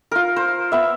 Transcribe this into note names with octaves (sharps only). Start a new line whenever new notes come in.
F4 A#4
C5
B3 E5